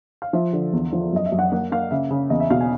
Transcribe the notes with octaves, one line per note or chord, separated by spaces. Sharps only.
F5
F3 E5
D3
E2
F3
F#2 D#5
E5
F#2
F#5
A#3 F#5
A#3 F5
C#3 E5
C#3
E2 D#5
E5
B2 F5
G#5